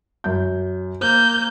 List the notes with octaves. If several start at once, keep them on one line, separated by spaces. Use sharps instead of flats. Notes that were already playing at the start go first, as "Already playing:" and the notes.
F#2 G6
A#3 C5 G6